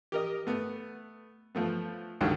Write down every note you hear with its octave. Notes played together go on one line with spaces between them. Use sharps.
G4 A#4 D#5
A3 B3
F3 A3 B3
C#2 G2 D3 D#3 F#3